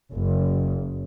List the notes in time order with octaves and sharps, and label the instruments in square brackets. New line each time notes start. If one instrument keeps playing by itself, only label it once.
[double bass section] F#1